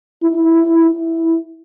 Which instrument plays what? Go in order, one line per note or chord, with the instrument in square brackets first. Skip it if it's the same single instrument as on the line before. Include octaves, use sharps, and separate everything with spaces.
[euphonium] E4
E4
E4